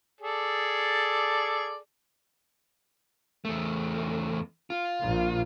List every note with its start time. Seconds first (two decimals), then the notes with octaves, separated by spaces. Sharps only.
0.21 G#4 A4 D5
3.45 E2 A3
4.70 F4
5.00 A#1 A#2